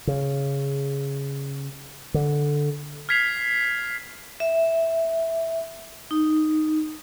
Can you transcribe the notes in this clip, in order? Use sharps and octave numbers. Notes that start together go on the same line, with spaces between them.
C#3
D3
F6 G#6 B6 C7 F7
E5
D#4